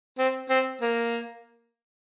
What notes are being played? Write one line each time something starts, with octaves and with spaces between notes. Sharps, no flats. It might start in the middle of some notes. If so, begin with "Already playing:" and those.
C4
C4
A#3